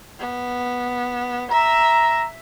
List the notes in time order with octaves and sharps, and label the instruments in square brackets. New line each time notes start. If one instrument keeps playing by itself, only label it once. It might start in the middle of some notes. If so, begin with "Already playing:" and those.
[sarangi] B3
[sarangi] E5 [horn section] A#5